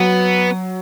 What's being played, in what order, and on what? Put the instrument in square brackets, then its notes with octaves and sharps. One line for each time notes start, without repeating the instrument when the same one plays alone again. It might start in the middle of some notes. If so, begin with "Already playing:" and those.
Already playing: [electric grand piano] F#3 [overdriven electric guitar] B3